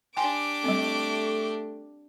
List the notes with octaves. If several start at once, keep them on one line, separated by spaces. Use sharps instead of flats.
D4 G4 G5 G#5 C6 D6
G3 A3 C4